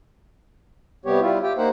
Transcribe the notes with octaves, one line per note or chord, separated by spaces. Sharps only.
C3 G3 B3 G4 C#5
G3 E4 F4
G4 G5
A#3 D#4 C5 F#5